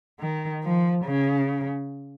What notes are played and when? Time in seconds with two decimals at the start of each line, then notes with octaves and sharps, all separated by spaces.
0.20 D#3
0.64 F3
1.06 C#3